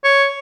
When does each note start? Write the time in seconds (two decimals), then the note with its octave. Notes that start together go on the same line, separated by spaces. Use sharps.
0.04 C#5